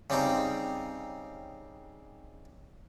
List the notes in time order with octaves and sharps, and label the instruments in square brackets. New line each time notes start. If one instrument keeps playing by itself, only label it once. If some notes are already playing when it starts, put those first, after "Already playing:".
[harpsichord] C#3 G3 C4 D#4